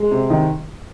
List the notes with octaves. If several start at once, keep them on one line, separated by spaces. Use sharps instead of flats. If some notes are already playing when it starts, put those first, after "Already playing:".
Already playing: G#3
C3
D#3